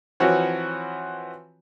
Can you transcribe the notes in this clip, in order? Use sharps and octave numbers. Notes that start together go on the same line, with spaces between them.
E3 F3 C4 F#4 B4 C#5